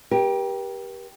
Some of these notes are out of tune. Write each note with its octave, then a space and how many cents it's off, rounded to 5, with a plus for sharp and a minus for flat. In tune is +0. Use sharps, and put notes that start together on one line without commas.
G4 +0 A#4 +45